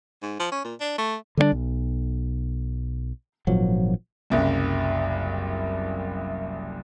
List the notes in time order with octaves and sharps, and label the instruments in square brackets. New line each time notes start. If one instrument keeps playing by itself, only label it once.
[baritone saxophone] G#2
F3
C#4
A#2
D4
A3
[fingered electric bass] D3 G3 A#3 D4
B1
G#1 A#2 F3 F#3
[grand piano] F#1 C2 F#2